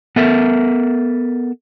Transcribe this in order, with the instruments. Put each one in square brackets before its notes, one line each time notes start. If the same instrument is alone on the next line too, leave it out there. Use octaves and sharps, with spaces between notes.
[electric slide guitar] B3 A4 A#4 E5